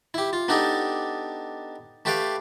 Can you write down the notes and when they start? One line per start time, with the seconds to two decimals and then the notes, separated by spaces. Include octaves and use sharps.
0.14 E4 G4
0.33 F4
0.48 B3 D4 D#4 G4 A4 D#5
2.05 A3 G4 B4 D5 F5 G5